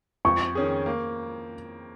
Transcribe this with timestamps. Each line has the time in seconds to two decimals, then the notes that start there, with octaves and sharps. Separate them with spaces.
0.25 F2 C#6
0.55 D#3 C#4 G#4
0.86 A#3